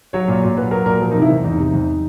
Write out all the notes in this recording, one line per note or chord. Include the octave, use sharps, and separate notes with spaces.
F#3 C#5
A#2
A#2
F#3 B4
F#3 A#4
A#2 A#4
F3
D#4
C3
E4
E2
E2 D#4
C3
E2